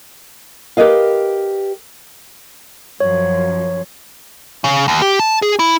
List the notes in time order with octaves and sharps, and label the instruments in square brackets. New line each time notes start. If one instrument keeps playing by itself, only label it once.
[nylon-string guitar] G4 A#4 B4 D#5 F5
[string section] F#2 F3 [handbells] C#5
[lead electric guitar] C#3
D#2
G4
A5
G#4
E4